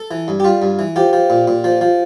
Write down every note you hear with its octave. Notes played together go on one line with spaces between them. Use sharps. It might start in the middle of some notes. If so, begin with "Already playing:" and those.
Already playing: A4
E3
G2
G4
G3 F4
G2
E3
F3 G4
F3
A#2
A#2
F3
F3